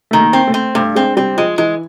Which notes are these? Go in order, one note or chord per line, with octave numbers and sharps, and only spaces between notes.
D#3 A3
A#3
C4
A3
C4
G2 A3
G#3 C4
G3 C4
F3 G#3
E3 G#3